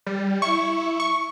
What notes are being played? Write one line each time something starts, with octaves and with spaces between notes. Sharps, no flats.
G3
E4 C#6
C#6